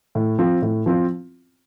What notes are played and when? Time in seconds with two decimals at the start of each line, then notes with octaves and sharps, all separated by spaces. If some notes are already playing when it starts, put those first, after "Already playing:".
0.15 A2
0.39 F3 C4 F4
0.62 A2
0.86 F3 C4 F4